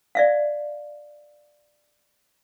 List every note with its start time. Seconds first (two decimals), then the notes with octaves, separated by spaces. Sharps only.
0.15 D5 E5 F5